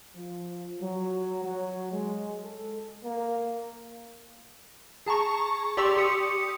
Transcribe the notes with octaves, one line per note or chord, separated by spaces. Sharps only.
F3
F#3
F#3
G#3
A4
A#3
G#4 A5 A#5 C#6
G4 D5 C6 C#6 E6 F7
G4 D#6 C#7